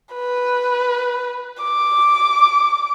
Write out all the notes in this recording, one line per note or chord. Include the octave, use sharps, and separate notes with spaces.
B4
D6